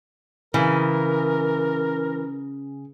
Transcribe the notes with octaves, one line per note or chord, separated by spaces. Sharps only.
C#3 E3 A#4